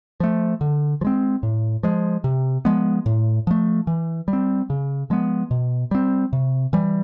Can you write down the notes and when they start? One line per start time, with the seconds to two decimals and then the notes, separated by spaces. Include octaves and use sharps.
0.20 F3 A3
0.61 D3
1.01 F3
1.05 G#3 C4
1.43 A2
1.83 F3 G#3
2.24 C3
2.65 F3 G#3 B3
3.06 A2
3.47 F3 A3
3.87 E3
4.28 G3
4.33 C4
4.70 C#3
5.10 F3 G#3 B3
5.51 B2
5.91 G3 C4
6.33 C3
6.73 E3 G3